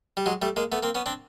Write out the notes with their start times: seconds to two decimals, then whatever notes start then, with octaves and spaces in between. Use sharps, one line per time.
0.17 G3
0.26 F#3 G#3
0.42 G3 A3
0.56 G#3 A#3
0.72 A3 B3
0.83 A#3 C4
0.95 B3 C#4
1.06 C4 D4